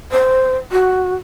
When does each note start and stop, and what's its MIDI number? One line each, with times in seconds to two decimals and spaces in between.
0.12 0.57 72
0.72 1.15 66